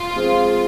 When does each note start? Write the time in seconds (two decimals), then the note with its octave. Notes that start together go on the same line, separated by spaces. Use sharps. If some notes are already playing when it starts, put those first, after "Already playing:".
Already playing: F4
0.15 F3 G#3 C4 G#4